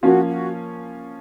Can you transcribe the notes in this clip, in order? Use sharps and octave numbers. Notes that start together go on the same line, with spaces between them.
F3 A#3 C#4 F4 F#4
F#4